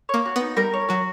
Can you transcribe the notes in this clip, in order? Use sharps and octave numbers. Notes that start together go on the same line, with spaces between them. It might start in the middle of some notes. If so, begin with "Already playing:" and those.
A#3 C#5
F#4
B3 D#4
G3 A#4
C#5
F#3 F#4